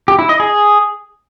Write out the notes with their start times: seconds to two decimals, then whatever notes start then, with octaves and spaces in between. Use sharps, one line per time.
0.08 G4
0.19 E4
0.29 D#5
0.40 G#4